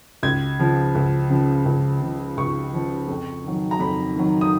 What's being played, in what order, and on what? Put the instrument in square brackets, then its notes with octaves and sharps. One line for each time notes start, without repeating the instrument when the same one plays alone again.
[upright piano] C#2 G#6
C#3 F3
C#2
C#3 F3
C#2
C#3 F3
C#2 C#6
C#3 F3
F2
D#3 F#3
A#5
F2 B5
D#3 F#3
D#6